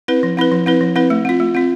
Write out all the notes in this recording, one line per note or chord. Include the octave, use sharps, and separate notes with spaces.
C4 E4 B4
F3
C4 E4 B4
F3
C4 E4 B4
F3
C4 E4 B4
A3
C4 F4
A3
C4 F4